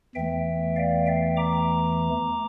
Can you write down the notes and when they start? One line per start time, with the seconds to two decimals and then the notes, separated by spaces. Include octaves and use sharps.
0.15 E2 E3 A3 E5 G5
0.76 D5 F5
1.06 E5 G5
1.37 A#5 D6